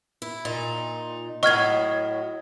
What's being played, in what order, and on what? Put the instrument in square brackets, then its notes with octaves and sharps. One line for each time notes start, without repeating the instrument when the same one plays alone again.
[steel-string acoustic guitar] E4
[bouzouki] A#2 [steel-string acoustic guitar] D#4
[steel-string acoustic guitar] A2 F#3 [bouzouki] D#5 [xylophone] C#6 F6 G#6